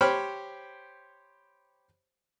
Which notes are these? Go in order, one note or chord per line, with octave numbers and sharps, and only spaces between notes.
G4 C5 C#5 G5 B5 F6